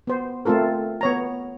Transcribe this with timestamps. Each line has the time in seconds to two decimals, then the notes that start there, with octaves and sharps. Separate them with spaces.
0.07 B3 C5
0.45 A3 C4 F4 A4 A#4
1.01 B3 C#5 A#5